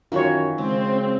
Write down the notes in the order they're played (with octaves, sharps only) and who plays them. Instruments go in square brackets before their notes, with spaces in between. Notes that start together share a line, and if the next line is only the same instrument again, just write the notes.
[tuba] F#2 [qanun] D#3 E3 F#4 [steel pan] F4 C#5
[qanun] C#3 [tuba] G#3 [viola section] C4